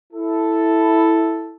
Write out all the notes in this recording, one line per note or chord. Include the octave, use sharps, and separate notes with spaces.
E4 A4